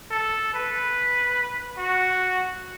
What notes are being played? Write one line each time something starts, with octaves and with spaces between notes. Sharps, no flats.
A4
B4
F#4